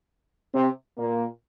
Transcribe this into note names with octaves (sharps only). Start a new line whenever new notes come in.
C3 C4
A#2 A#3